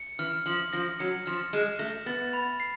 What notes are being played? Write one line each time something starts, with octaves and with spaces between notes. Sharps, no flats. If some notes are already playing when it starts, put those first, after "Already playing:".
Already playing: C#7
E3 F6
F3 F#7
F3 A#6
F#3 C#7
F3 F6
G#3 E7
A3 A#6
B3 A6
B5
C7